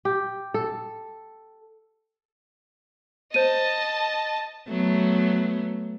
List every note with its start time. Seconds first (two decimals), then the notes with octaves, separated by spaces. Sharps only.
0.05 G4
0.54 A4
3.34 C5 D#5 A5 D#7
4.67 F#3 A3 B3